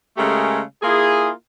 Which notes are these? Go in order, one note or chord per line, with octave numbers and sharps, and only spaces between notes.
C#3 G#3 A3 G4 G#4 A#4
A#3 E4 F4 G#4